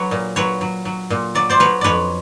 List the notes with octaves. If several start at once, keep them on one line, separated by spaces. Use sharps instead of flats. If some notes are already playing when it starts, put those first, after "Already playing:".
Already playing: F#3 B4 C#5
A#2
F#3 B4 C#5
F#3
F#3
A#2
F#3 D5
C5 D5
F#3 B4 C#5
F2 B4 C#5 D5